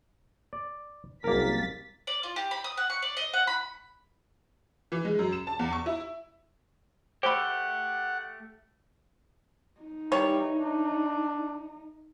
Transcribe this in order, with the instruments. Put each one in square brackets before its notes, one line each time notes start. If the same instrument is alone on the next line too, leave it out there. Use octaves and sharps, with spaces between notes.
[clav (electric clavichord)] D5
[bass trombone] F#1 [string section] C2 A6 B6 [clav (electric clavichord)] A#3 A#4
[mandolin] D5
F4
G4
B5
D#6
F#5
C#6
D5
D#5
F#5
B5
[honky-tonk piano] E3
G#3
F#2
E7
A5
E2
C#6
E4
[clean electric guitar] A3 G4 [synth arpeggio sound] C5 B5 [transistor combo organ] F#5
[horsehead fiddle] D#4
[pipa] D#3 E3 C#5 [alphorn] G3
[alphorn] D4